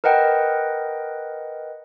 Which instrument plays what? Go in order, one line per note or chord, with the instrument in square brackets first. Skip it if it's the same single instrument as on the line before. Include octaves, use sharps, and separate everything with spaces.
[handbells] A#4 B4 D#5 F#5 G5